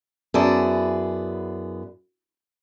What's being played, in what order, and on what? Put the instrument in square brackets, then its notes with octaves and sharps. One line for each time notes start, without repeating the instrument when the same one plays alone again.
[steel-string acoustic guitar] F#2 B3 E4 G#4 D5 A5